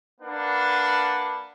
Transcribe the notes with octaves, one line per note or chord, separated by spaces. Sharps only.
A#3 D4 B4 F#5